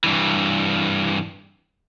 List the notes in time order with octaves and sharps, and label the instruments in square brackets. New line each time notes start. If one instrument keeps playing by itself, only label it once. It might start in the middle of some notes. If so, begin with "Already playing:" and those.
[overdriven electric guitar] G2 E3